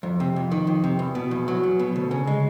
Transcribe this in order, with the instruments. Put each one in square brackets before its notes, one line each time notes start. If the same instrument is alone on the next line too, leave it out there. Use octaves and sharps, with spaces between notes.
[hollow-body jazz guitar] F2
C3
F2
D#3
F2
C3
E2
B2
E2
F#3
E2
B2
D2
C#3
G#3